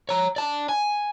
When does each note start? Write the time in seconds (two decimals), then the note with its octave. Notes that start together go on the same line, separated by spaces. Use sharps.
0.09 C#5 A#5
0.36 D5 A5
0.69 G#5